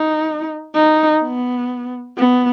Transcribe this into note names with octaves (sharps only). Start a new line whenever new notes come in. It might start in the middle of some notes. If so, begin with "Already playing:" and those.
Already playing: D#4
D#4
B3
B3